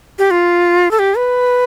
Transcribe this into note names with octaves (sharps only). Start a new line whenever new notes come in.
G4
F4
A4
G4
B4